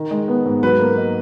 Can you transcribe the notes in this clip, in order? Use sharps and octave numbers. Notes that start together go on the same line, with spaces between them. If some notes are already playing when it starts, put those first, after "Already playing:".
Already playing: D#3
G#3
B3
G#2
F#3 B4
A#3
D#4